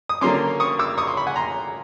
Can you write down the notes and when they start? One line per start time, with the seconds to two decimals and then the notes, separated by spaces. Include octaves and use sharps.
0.09 D#6
0.21 D3 F#3 A#3 C#4 C6 D6
0.60 C#6 D#6
0.79 D6 E6
0.98 C#6 D#6
1.07 C6 D6
1.17 B5 C#6
1.27 F#5 G#5
1.36 A#5 C6